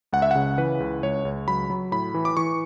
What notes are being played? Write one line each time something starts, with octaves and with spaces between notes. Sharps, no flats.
C#2 F#5
E5
C#3 F#5
E3 B4
C#2
C#2 C#5
C#2
F#3 B5
F#3
A2 B5
E3
D6
E3 C#6